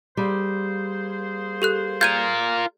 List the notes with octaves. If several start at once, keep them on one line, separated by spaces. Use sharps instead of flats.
G3 A#3 G#4 C5
G4 A4 F#6
F4 A#4 G6 G#6 D#7